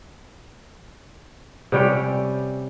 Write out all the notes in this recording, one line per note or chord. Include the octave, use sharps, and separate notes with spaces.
C3 G3 C#4 G5